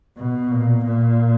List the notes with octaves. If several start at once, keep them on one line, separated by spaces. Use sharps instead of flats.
B2
A#2
A#2